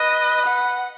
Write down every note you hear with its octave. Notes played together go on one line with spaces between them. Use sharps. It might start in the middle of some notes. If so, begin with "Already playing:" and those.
Already playing: B4 D#5
F#5